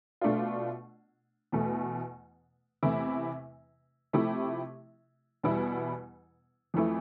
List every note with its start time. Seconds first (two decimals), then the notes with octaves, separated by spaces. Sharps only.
0.21 B2 A3 D4 F4
1.52 E2 B2 A3
2.83 E2 C3 E3 A3 E4
4.13 C3 F3 A3 E4 G4
5.44 E2 B2 G3 B3 E4
6.74 F2 E3 A3 E4